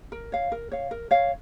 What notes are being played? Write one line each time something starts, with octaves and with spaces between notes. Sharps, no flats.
A#4
C#5 F5
A#4
C#5 F5
A#4
C#5 F5